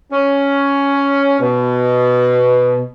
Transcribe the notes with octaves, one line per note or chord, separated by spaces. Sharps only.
C#4
B2